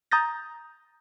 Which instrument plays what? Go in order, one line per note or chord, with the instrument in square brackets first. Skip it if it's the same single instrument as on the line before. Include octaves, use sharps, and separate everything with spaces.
[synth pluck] A#5 D#6 G6 A6 A#6